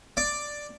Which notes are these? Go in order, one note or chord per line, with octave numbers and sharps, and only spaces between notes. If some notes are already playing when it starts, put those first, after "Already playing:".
D5